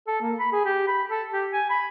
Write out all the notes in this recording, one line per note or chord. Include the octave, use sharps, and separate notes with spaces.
A4
A#3
B5
G#4
G4
B5
A4
G4
G#5
B5